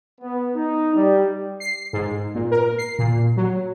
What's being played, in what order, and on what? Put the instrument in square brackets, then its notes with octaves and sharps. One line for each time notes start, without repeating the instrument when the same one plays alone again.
[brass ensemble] B3
D#4
G3
[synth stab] C7
G#2
A#2
A#4
C7
A#2
F#3